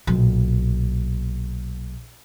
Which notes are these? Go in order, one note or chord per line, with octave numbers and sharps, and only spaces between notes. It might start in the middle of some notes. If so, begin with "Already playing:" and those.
B1 A#2